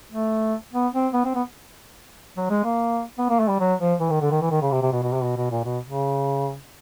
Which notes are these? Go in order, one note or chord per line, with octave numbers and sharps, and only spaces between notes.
A3
B3
C4
B3
C4
B3
F#3
G#3
A#3
B3
A#3
A3
G3
F#3
F3
E3
D#3
D3
D#3
E3
D#3
C#3
C3
C3
B2
B2
C3
B2
B2
A#2
B2
C#3